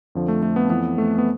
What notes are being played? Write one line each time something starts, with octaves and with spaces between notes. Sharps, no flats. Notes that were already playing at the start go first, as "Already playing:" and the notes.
F2 D3 F3
A3
A3
B3
F2 E3 B3
A3
B3